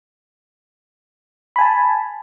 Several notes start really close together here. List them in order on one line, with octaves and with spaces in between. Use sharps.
B5 G#5 A5